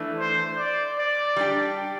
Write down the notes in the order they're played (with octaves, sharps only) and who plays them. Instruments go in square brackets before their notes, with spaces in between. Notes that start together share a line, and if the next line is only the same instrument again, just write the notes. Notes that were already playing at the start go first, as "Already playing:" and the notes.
Already playing: [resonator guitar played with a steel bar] E3 A3 D4
[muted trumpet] C5
D5
D5
[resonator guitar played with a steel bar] G3 D4 G4